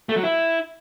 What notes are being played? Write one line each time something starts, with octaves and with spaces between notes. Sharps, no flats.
A3
F#3
E4